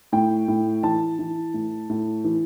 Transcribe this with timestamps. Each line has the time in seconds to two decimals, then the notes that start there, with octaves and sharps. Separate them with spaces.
0.12 A2 G5
0.48 A2
0.83 E3 A5
1.19 E3
1.54 A2
1.89 A2
2.24 E3